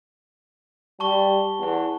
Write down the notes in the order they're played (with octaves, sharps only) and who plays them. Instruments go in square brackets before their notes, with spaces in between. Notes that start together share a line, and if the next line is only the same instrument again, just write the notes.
[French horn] G3 [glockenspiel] A5 C#6 G7
[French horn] E2